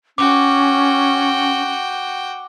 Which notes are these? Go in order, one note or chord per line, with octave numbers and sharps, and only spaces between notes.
C#4 F#4 G5 D6